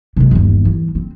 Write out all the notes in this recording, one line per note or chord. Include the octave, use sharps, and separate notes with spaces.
C3 G#3
G1 D#2
E3
C4